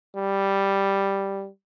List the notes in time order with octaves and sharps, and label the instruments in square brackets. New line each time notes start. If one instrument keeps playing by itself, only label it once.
[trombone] G3